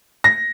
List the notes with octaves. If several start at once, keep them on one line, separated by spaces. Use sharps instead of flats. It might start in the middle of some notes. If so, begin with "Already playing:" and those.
A#6